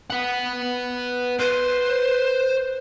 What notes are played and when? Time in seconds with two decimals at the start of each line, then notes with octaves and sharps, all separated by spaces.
0.10 B4 F#5
1.39 B4 C5